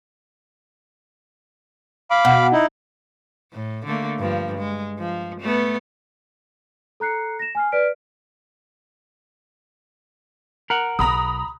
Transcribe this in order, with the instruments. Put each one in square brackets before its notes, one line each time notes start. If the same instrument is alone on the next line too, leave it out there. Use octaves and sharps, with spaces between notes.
[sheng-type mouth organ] F5 B5 D6
[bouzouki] B2
[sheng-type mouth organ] D#4 E4
[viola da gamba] A2
D3 A3 A#3
G2 F3
G#3
F3
A3 B3
[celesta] A4 A#5 F#6 C7 C#7
A#6 E7
G#5 F6 C7
B4 D5 F6 B6 D7
[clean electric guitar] A#4 F#5
[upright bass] B1 [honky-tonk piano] A#5 B5 D#6